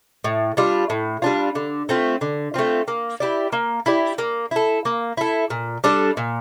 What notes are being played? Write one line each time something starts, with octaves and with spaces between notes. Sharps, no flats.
A2
G3 D4 F4
A2
G3 D4 F4
D3
A3 C4 F4
D3
A3 C4 F4
A#3
E4 G4 D5
A#3
E4 G4 D5
A#3
E4 A4
A#3
E4 A4
A#2
G3 D4 A4
A#2